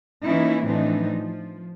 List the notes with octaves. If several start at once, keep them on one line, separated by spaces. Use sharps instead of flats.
E3 A#3 C#4 D#4 E4
A2 E3 F3 C4 D4 D#4
F3